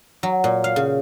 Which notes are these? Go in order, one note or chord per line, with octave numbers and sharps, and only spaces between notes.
F#3
A#2
F5
C#3